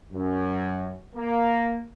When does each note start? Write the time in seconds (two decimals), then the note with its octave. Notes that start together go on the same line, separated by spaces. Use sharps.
0.12 F#2
1.15 A#3